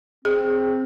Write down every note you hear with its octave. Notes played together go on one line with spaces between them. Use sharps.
C4 G#4